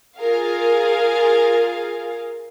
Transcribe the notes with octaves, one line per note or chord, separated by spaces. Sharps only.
F4 G#4 A#4 F5